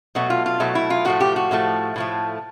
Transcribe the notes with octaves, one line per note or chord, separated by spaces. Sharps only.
B2 F#3 A3 F#4
F4
F4
B2 F#3 A3 E4
E4
F4
A2 F3 A3 F#4
G4
F#4
A2 F3 A3
A2 F3 A3